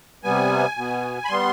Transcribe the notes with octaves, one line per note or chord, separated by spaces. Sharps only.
C3 G3 B3 G#5
B2 B3
B5
G3 B3 C6